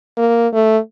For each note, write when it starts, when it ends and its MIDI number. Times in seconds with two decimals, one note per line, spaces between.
0.17 0.47 58
0.53 0.78 57